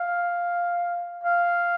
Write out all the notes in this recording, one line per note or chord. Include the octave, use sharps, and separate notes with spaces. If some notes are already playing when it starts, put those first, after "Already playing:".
Already playing: F5
F5